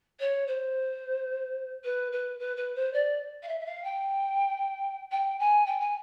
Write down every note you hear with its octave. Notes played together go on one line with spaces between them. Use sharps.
C#5
C5
B4
B4
B4
B4
C5
D5
F5
E5
E5
F5
G5
G5
G#5
G5
G#5